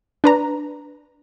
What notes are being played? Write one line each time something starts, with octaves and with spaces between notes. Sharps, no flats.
D4 B4 A#5